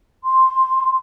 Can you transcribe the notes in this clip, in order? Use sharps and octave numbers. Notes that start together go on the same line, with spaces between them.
C6